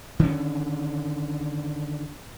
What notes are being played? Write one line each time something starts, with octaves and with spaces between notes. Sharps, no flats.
D3 D#3 C4 C#4